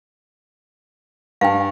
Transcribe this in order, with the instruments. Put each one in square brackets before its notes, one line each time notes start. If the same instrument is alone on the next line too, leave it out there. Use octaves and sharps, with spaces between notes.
[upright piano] G2 [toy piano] F5 G5